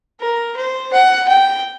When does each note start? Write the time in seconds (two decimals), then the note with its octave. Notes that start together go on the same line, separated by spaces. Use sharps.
0.20 A#4
0.56 C5
0.93 F#5
1.28 G5